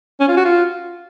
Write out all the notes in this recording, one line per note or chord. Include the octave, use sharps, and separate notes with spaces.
C#4
F4
F#4
F4